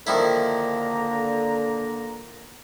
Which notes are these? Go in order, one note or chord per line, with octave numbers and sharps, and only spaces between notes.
D3 D#3 F3 A#3 E4 A#5